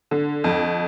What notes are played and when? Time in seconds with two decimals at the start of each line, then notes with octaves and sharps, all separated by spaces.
0.11 D3
0.44 F2